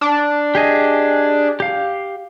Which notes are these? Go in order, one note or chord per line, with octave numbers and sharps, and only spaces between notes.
D4
G4 G#4 D#5
G4 F5